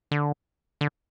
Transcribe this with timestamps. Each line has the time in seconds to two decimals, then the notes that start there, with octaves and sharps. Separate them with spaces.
0.11 D3
0.81 D3